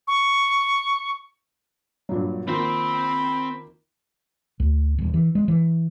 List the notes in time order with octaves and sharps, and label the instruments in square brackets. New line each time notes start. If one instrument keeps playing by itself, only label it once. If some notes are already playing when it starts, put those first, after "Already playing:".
[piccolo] C#6
[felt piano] G2 A#2 F#3
[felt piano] D#3 F3 A#3 [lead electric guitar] C4 C5 [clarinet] B5
[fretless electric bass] D2
D#1
E3
G#3
E3